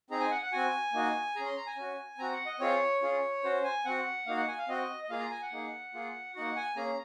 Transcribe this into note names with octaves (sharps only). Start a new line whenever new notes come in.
C4 D#4 G#4 A#5
G#5
F#5
F#5
C4 F#4 G#5
A#3 D#4 F#4
C#4 G#4 A#5
C6
A#5
G#5
C#4 F#4
C4 F#4 A#5
F#5
D#5
C4 F4 G#4 C#5
C#4 F4 G#4
C#4 F#4 C5
G#5
C4 F#4 F#5
A#3 D#4 F#4 F5
F#5
G#5
F5
C4 F#4 D#5
D#5
A#3 F4 G#4 F5
A#5
G#5
F#5
A#3 D#4 G#4
A#3 F4 G#4
A#3 D#4 F#4 F#5
G#5
A#3 C#4 G#4 A#5